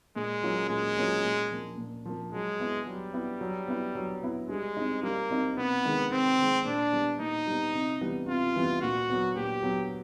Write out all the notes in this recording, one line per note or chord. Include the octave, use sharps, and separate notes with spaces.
A#2 G#3
F#3 A#3 C#4 F4
A#2 G#3
F#3 A#3 C#4 F4
A#2
F3 A#3
A#2
F3 A#3
F#3 G#3
B3 E4
F#3 G3
B3 E4
F#3
B3 E4
F#3
B3 E4
G3 G#3
C4 D#4
G3 A#3
C4 D#4
C3 B3
D#3 G#3
C3 C4
D#3 G#3
A#2 D4
G3 B3
A#2 D#4
G3 B3
C3
E3 G3 B3
C3 F4
E3 G3 B3
A#2 F#4
F#3 B3
A#2 G4
F#3 B3